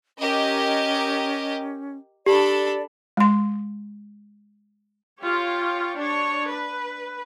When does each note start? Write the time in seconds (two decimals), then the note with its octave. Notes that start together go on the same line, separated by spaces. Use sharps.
0.19 C#4 G4 A#4 D#5
2.26 D4 G4 A4 D5 B5
3.17 G#3 C6
5.21 F4 G4 C#5
5.98 D4 C#5
6.50 B4